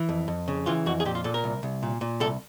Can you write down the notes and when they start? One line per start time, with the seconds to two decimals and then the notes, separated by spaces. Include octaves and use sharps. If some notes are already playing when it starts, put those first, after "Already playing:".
Already playing: E3
0.09 F2
0.28 F2
0.48 C#3
0.66 E3 F4
0.86 F2 F#4
1.00 G#4
1.05 A#2 G4
1.15 F4
1.24 A#2 A4
1.34 A#4
1.44 C2
1.63 C2
1.83 A#2
2.01 A#2
2.20 C2 A4